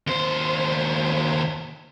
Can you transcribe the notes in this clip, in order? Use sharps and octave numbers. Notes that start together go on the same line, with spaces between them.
D#2 C5